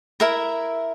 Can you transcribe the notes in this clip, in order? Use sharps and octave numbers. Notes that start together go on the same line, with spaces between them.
E4 A#4 E5 A#5